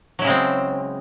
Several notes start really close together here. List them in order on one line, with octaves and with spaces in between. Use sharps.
F#3 E4 C#3 G#3 C4